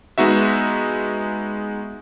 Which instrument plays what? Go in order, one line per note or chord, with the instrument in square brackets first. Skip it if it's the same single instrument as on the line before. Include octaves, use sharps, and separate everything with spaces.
[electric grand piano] G#3 B3 D#4 F#4 E5